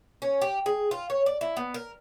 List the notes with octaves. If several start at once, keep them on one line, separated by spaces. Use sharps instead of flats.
C#4
G4
G#4
F4
C#5
D5
E4
B3
A#4